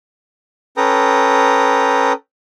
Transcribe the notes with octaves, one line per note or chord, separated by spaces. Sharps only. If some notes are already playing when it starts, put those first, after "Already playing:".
C#4 A4 B4 G5 A#5 D#6